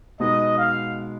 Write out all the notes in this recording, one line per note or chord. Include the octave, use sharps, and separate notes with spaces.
B2 G#3 B3 D#4 D#5
F5